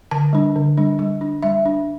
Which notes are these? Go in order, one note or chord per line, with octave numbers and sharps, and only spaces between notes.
D3 A5
G3 D4
D3
G3 D4
G3
D4
G3 E5
D4